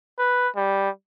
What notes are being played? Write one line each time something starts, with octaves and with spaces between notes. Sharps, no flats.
B4
G3